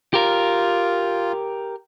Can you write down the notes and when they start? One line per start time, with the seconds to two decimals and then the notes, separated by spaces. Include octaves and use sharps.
0.14 F4 G4 A#4